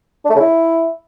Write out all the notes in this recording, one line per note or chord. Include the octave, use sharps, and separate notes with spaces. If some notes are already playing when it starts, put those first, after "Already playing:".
D4
A3
C#3
E4